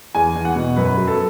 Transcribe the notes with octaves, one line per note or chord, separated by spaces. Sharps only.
E2 G#5
E2
F#5
B2
F#2 B4
F#3
A4